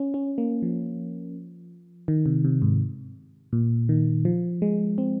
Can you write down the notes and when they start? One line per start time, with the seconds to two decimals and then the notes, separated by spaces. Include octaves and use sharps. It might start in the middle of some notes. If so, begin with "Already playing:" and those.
Already playing: C#4
0.14 C#4
0.38 A#3
0.62 F3
2.08 D#3
2.26 C3
2.44 C3
2.62 G#2
3.53 A#2
3.89 D#3
4.25 F3
4.62 G#3
4.98 C4